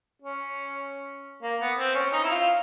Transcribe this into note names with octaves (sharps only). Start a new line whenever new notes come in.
C#4
A#3
B3
C4
C#4
D#4
E4
F4